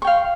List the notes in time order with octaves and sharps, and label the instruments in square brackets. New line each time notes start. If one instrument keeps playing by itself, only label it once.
[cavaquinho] C#6
G5
F5